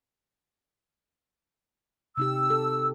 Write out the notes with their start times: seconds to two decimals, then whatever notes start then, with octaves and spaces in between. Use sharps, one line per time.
2.17 C3 D#4 G4 E6
2.50 A4